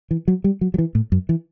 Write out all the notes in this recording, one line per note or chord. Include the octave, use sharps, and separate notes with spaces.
E3
F#3
G3
F#3
F#3
E3
A2
F#2
E3